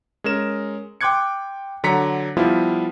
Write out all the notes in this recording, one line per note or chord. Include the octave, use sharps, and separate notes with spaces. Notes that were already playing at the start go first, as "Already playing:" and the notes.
G#3 C#4 A#4 E7
G5 C6 D6 F#6 G#6 C#7
D3 F#3 A#5 B6 C#7
F3 G3 B3 E4 F4